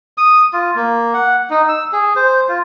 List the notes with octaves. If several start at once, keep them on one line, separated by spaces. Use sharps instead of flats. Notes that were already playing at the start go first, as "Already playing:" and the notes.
D#6
F4
A#3
F#5
D#4
E6
G#4
C5
F4